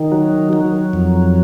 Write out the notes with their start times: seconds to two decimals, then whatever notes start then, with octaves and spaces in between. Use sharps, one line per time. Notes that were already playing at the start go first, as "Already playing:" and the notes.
Already playing: D#3
0.12 F#3
0.53 F#3
0.93 F2